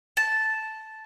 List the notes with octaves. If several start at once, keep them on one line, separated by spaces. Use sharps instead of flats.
A5